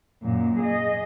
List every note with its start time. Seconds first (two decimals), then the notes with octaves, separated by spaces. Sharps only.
0.24 F#2 A#2
0.60 G#4 D#5